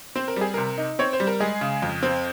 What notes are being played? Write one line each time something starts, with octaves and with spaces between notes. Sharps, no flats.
C4 C5
A#4
G3 G#4
C3 A#4
D#4
C4 C#5
C5
G3
A#4
G#3 G#4
C#3
F2
C4